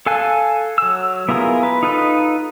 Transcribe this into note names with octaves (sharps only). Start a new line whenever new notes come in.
A4 F5 G#5 A5 F#6
F#3 E6
B3 E4 F4 G#4 A#4
B4
D#4 F4 A4 B4 D#5